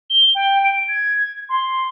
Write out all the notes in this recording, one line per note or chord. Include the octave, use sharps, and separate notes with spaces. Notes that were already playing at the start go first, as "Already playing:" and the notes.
G7
G5
D7
G#6
C6